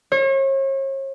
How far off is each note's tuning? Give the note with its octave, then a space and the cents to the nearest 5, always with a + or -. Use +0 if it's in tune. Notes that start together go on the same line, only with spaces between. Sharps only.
C#5 -40